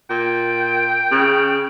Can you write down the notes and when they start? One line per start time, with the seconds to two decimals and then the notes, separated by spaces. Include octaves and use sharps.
0.10 A#2 G5
1.12 C#3